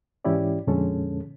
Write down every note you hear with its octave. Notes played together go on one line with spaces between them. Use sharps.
G#2 E3 C#4 E4 G4 D5
F2 A#2 D3 G#3 C#4 A4